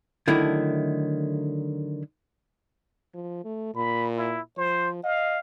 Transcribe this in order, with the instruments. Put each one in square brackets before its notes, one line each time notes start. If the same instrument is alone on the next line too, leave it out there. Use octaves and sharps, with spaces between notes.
[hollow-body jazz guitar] D3 D#3 F#3 A3 E4
[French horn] F3
A3
[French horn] A#2 [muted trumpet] B5
[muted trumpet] E4
[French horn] F3 [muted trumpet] C5
[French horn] D#5 [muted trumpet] F5